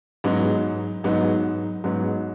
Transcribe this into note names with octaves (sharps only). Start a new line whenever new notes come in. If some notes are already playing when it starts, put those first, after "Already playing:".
G#2 F#3 B3 D#4
G#2 F#3 B3 D#4
G#2 F#3 B3 D#4